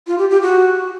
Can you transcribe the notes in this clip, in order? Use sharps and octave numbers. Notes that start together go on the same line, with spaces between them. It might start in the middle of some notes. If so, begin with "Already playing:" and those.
F4
G4
G4
F#4